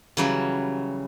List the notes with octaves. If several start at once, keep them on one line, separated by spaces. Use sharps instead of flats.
C#3 E3 F#3 G3 F#4